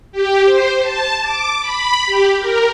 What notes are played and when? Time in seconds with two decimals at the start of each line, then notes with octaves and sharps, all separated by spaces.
0.12 G4
0.45 C5
0.81 A5
1.22 D6
1.61 B5
2.06 G4
2.39 A#4